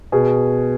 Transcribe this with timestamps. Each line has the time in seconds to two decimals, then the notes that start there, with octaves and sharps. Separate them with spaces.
0.12 B2 G#4